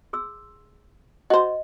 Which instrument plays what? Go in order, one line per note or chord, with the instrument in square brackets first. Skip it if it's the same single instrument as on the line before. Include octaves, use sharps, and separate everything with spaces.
[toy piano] G#4 C6 E6
[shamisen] F#4 C5 [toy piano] D#5